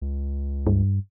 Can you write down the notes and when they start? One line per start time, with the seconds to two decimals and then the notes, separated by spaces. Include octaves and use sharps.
0.02 C#2
0.67 G2